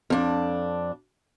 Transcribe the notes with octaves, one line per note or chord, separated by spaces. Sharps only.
F2 D4